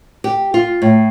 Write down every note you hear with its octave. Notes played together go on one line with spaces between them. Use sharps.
G4
F4
A2